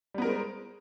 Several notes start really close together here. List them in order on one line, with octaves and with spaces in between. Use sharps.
G3 B3 A#4 G#3 C5